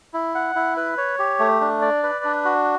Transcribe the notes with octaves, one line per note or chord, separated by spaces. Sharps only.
E4
F#5
E4
B4
C#5
G4
A3
D4
D5
B4
D4
F#4